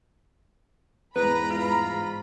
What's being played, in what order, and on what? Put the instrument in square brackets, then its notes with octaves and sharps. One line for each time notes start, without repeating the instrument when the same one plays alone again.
[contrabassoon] E2 [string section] G#2 B5 [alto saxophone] B4 [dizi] A#5
[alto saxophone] F4